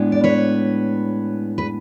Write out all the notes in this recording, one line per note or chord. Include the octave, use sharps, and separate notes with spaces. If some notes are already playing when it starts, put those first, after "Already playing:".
Already playing: A2 G#3 B3 D4
D5
B4 C#5
B4